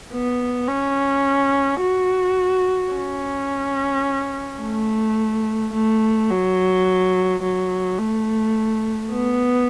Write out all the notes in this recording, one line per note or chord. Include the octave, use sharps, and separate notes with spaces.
B3
C#4
F#4
C#4
A3
A3
F#3
F#3
A3
B3